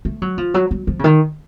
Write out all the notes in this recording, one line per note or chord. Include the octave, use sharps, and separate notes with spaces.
A3
F#3
F3
F#3
F#3
F3
C#3
D#3